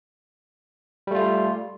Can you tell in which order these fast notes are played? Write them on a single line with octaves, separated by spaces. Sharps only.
G3 A3 F4